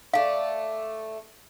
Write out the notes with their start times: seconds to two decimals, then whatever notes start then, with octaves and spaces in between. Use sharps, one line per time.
0.13 A3 D5 F5